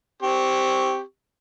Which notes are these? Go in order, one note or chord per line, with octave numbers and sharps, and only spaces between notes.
C4 G4 C#6